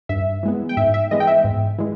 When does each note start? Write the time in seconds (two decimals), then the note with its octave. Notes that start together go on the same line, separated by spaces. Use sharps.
0.09 G2 E5
0.43 E3 G#3 B3
0.69 G5
0.77 G#2 E5
0.94 E5
1.11 E3 G#3 B3 D#5
1.20 G5
1.27 E5
1.44 G#2
1.78 E3 G#3